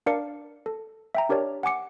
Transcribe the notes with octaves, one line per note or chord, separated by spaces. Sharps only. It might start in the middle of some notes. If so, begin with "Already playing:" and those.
D4 A#4 D5 F5 C#7
A4
E5 G5 A#5
D4 G4 A#4 C#5 D5
F#5 G#5 D6 C#7